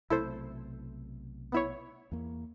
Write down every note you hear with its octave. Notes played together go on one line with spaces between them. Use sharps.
B1 C3 A3 E4 A4 C5
B3 E4 C#5
E2 A#3